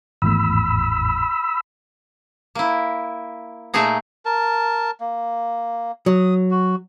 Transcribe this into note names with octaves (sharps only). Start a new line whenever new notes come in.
G#1 E2 A2 B5 E6
A#3 E4
A#2 A3 A#3 D#4 G#4 A#5
A#4 A5
A#3
F#3 D#6
F#4